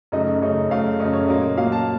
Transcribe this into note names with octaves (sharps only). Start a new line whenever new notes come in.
F#2 C#3 A3 D#4 D#5
F#2 C#3 A3 D#4
F#2 C#3 A3 F5
F#2 C#3 A3 D#5
C#5
A#2 F#3 A#3 D#5
A#2 F#3 A#3 F5
A5